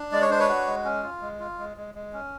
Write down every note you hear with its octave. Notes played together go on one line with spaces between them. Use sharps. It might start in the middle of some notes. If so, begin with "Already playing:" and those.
Already playing: D4
G#3 D5
C#5
D4 C5
B4 C#5
F#4
G#3
C#4
F4
G#3
F4
G#3
G#3
G#3
C#4